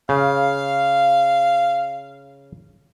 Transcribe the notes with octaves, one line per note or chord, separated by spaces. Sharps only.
C#3 F5